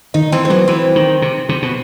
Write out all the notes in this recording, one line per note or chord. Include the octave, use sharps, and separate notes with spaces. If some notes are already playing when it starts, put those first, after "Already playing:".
D#3 D#4
E3 C4
C4
F#3 B3
E3 C4
D#3
C3
C3
B2